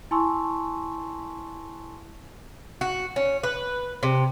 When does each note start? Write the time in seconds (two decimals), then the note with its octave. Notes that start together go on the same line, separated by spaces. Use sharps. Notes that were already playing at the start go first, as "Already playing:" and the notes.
0.11 E4 G#5 A5 C6 C#6 E6
2.81 F#4
3.16 C#4
3.43 B4
4.03 C3